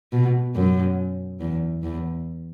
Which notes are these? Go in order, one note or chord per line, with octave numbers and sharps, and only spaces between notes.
B2
F#2
E2
E2